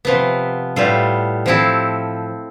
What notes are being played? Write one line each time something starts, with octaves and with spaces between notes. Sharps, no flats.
C3 F3 B3
A2 G3 B3 F4 A4
F3 C4 E4 A4